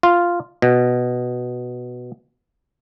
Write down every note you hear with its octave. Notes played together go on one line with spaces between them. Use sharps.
F4
B2